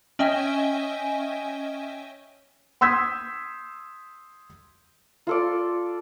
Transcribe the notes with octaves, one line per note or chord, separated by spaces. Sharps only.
C#4 D#5 E5 G5 G#5
C6 D#6 E6 G6 G#6 B6
F4 A4 D5